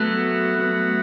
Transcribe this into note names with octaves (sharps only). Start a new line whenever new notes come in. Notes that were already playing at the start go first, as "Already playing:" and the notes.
Already playing: F#3 A3 B3 F#4
F#3 B3 F#4